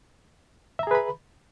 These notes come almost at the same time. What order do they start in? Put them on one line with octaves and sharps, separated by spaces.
E5 A#5 G#4 B4 B5